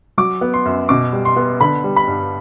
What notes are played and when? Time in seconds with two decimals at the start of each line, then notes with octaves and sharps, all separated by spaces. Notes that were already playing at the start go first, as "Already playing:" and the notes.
0.18 F#3 D6
0.41 B3
0.54 C6
0.65 F#2
0.89 B2 D6
1.13 G3
1.25 C6
1.36 B3
1.61 D3 B5
1.84 G3
1.96 B5
2.08 G2